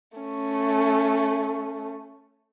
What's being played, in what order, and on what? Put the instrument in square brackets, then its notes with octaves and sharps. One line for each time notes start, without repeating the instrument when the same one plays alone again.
[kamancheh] A3 C#4